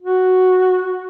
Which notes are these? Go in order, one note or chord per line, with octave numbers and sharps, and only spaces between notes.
F#4